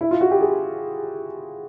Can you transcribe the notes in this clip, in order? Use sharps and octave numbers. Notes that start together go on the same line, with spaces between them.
E4
F4
F#4
G4
G#4